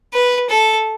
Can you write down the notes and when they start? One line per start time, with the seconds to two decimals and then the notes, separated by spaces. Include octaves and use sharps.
0.14 B4
0.50 A4